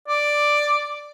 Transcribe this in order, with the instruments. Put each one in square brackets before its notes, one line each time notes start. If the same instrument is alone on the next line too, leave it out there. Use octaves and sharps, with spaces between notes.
[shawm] D5